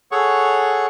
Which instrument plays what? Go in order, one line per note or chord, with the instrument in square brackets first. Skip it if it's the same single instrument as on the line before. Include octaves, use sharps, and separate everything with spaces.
[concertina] G#4 A4 C#5 F#5 C#6